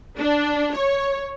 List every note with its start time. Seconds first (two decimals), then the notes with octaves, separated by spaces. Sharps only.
0.20 D4
0.76 C#5